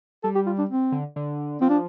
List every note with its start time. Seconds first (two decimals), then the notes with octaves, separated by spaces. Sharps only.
0.24 G3 A4
0.35 G4
0.46 F4
0.58 D4
0.70 C4
0.92 D3
1.16 D3
1.61 F3 C4
1.70 D4